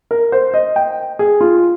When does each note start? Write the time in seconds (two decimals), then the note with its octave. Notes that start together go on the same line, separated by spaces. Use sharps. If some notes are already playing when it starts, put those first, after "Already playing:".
0.11 A#4
0.32 C5
0.54 D#5
0.76 G5
1.19 G#4
1.41 F4